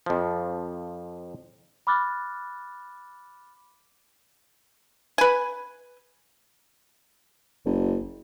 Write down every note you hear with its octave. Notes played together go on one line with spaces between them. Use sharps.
F2 F3
B5 D6 F6 F#6 A6
B4 G#5
F#1